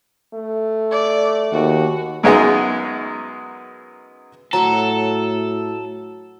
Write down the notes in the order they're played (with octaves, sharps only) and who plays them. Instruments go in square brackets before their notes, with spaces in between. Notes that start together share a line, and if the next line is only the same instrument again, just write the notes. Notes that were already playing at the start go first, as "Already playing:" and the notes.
[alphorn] A3
[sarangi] D5
[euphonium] D#2 [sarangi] F#4
[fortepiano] F#2 F#3 G#3 B3 D#4 G#4
[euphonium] A2 [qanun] F#3 F#4 C#6 [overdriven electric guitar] A4 [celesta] A#5